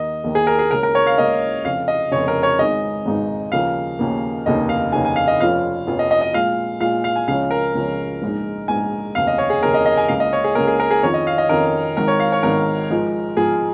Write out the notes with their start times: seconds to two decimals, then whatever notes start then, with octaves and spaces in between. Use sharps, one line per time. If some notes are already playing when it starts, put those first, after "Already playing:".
Already playing: D#2 D#3 A#3 D#5
0.24 D#2 D#3 A#3
0.35 G#4
0.47 A#4
0.59 G#4
0.71 C#2 C#3 A#3 C#4 A#4
0.83 A#4
0.95 C#5
1.07 F5
1.18 C#2 C#3 A#3 C#4 D#5
1.65 F1 F2 C#3 F5
1.88 D#5
2.11 F1 F2 C#3 C#5
2.28 A#4
2.43 C#5
2.59 G#1 G#2 G#3 D#4 D#5
3.05 G#1 G#2 G#3 D#4
3.52 D#2 C#3 F3 A#3 F5
3.99 D#2 C#3 F3 A#3
4.46 F1 D#2 C#3 A#3 D#4 D#5
4.69 F5
4.92 F1 D#2 C#3 A#3 D#4 G#5
5.05 G#5
5.16 F5
5.28 D#5
5.40 F1 F2 F3 C#4 F4 F5
5.87 F1 F2 F3 C#4 F4
5.99 D#5
6.11 D#5
6.21 D#5
6.34 A#2 G#3 F4 F5
6.80 A#2 G#3 F4 F5
7.04 F5
7.16 G#5
7.27 C#2 C#3 F3 C#4 F5
7.51 A#4
7.75 C#2 C#3 F3 C#4
8.21 A#1 G#2 G#3 D#4
8.68 A#1 G#2 G#3 D#4 G#5
9.15 F1 D#2 C#3 F5
9.27 D#5
9.38 C#5
9.50 G#4
9.62 F1 D#2 C#3 A#4
9.74 D#5
9.86 D#5
9.97 G#5
10.08 C#2 C#3 A#3 F5
10.20 D#5
10.33 C#5
10.44 G#4
10.55 C#2 C#3 A#3 A#4
10.67 G#4
10.80 A#4
10.91 G#4
11.03 F2 D#3 C#4 F4 C#5
11.14 D#5
11.27 F5
11.38 D#5
11.49 F2 D#3 C#4 F4 A#4
11.97 G#1 G#2 D#3 A#4
12.08 C#5
12.20 F5
12.32 C#5
12.43 G#1 G#2 D#3 A#4
12.90 G#2 F3 G#3 F4
13.37 G#2 F3 G#3 F4 G#4